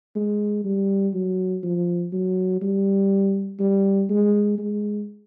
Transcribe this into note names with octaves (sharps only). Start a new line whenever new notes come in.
G#3
G3
F#3
F3
F#3
G3
G3
G#3
G#3